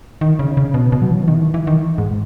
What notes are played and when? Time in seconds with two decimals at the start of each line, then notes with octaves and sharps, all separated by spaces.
0.21 D#3
0.39 C#3
0.57 C#3
0.74 B2
0.92 B2
1.02 F#3
1.10 E3
1.28 D#3
1.34 E3
1.41 D#3
1.54 E3
1.67 D#3
1.98 G#2